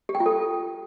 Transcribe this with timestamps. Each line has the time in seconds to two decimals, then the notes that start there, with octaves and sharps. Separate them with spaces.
0.09 G4
0.15 G5
0.20 F4
0.26 A4